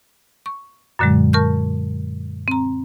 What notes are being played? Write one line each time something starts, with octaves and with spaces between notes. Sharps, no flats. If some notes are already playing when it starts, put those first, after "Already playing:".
C#6
F#2 A#2 D3 F#3 G#3
A#4 A5 C#6 F6 G6
C4 A#5